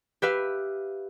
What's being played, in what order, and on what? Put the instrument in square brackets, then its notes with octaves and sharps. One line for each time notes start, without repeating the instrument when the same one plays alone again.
[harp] G4 B4 E5 F5